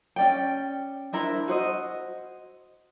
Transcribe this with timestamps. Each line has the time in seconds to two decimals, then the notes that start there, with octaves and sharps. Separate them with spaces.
0.16 C#4 D5 G5
1.13 D4 E4 A#4 C5
1.48 F#4 C5 D#5